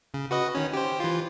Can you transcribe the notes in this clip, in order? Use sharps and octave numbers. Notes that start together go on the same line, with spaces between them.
C#3
F#4 B4 D#5
D#3 C#4
G4 C5
E3 F4